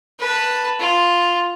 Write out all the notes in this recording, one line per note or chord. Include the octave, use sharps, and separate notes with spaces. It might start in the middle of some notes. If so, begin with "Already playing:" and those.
B4 A5
F4